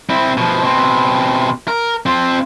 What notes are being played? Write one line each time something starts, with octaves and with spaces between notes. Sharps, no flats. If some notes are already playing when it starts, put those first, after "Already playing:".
C4 E4
B2 F3
B2 C4
A#4
C4 F4